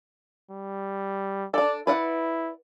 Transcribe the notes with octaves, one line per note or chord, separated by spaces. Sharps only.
G3
D4 A4 D5
E4 B4 D5 F#5